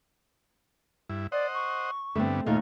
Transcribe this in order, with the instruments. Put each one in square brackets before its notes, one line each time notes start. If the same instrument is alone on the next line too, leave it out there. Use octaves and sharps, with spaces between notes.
[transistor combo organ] G2 E4
[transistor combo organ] C5 D#5 F#5 [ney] D5
[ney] C#6
[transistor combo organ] G2 D3 B3 [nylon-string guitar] A3 C4
[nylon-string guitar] D#2 A3 [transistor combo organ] A#2 F4 [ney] D#4